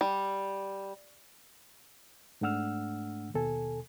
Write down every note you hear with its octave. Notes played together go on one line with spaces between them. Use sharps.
G3
G#2 A3 D4 F#5 E6 F6
D#2 B2 A4 G#5